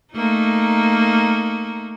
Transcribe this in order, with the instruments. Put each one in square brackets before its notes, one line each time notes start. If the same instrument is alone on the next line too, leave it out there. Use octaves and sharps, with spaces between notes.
[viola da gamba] A3 A#3 D#4